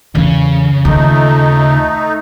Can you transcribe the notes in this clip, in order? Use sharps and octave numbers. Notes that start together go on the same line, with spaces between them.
E2 C#3
D#2 A3 D#4 F4